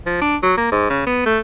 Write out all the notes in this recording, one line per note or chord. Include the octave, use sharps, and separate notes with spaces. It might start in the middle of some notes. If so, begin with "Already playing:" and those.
F3
D4
F#3
A#3
G#2
C#3
B3
A3